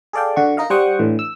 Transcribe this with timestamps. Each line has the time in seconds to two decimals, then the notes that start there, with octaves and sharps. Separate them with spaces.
0.13 G#4 A4 D5 F5 G5
0.36 D3 F#4 C#6
0.57 D#4 A#4 D#5 F5
0.70 G3 C5 F#5 G5 C#6 D#6
0.99 A2 D3 E3
1.19 E6